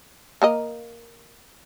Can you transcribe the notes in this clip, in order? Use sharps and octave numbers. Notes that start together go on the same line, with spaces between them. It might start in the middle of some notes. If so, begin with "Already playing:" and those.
A#3 A#4 D#5